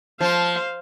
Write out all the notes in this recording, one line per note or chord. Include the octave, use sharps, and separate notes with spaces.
F3 C5 F5